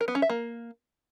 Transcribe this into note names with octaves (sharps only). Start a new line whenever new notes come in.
A#4
B3
C#4
E5
A#3